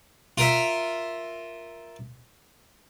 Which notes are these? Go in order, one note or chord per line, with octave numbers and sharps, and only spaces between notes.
F4 A#4 E5